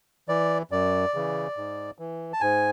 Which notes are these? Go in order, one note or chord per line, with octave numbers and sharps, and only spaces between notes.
E3 D5
F#2 D5
C#3 E3
G#2
E3
A5
G#2 G#5